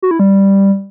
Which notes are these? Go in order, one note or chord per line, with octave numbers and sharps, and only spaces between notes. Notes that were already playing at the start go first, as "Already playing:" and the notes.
F#4
E4
G3